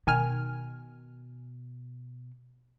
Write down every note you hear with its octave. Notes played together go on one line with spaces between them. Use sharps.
B2 D#3 G#5 F6